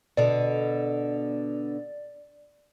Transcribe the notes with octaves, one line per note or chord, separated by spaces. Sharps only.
B2 D3 D5